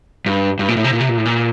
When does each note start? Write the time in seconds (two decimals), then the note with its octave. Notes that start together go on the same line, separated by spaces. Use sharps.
0.26 G2
0.59 G2
0.68 A#2
0.77 A2
0.84 C3
0.93 A#2
1.00 C3
1.09 A#2
1.18 A2
1.25 A#2